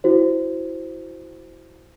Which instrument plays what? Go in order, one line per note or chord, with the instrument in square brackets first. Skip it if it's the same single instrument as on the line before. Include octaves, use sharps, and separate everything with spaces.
[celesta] E4 F#4 C5